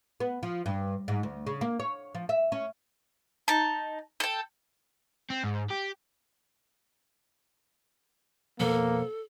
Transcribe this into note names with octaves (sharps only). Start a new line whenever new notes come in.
B3
F3
G2
G#2
D2
C#3
A#3
C#5
F3
E5
C#4
D#4 A5
A4 G5
C4
G#2
G4
F2 B2 A#3 A4 C5